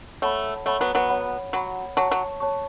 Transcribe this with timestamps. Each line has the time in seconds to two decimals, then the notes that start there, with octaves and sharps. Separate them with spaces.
0.22 A3 C#5 F#5 B5
0.66 A3 C#5 F#5 B5
0.81 F#3 B3
0.95 F#3 B3
1.09 C#5 F#5 B5
1.53 F#3 C#5 F#5 B5
1.97 F#3 C#5 A5 C#6
2.11 F#3
2.40 C#5 A5 C#6